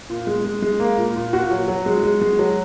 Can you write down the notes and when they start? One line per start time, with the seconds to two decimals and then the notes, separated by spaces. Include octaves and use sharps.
0.10 A#2
0.27 G#3
0.45 G#3
0.62 G#3
0.80 A#3
0.98 A#2
1.16 A#2
1.33 A#2 F#4
1.51 F#3
1.68 F#3
1.86 G#3
2.03 G#3
2.21 G#3
2.39 F#3